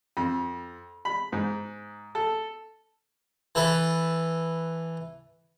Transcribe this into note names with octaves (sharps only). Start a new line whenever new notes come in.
F2
B5
G#2
A4
E3 A4 B4